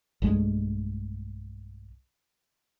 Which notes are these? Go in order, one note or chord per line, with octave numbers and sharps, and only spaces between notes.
B1 G2 G#3 A3